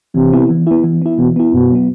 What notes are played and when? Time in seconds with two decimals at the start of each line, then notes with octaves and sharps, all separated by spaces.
0.15 C3 E3
0.33 B3 E4
0.50 E3
0.67 B3 E4
0.84 E3
1.02 B3 E4
1.18 B2 E3
1.36 B3 E4
1.53 F#2 B2
1.71 F#3 B3